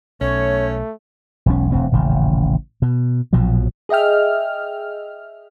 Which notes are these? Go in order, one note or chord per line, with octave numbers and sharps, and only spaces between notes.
B1 A3 C#4 C#5
E1 B1 C#4
E1 D2 C4
D#1 A1 C#3
B2
A#1 B2 F3 F#3
G#4 D#5 E5 G5 F6